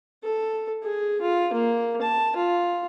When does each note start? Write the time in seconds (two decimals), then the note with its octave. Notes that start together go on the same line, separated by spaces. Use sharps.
0.23 A4
0.83 G#4
1.21 F4
1.53 A#3
2.02 A5
2.36 F4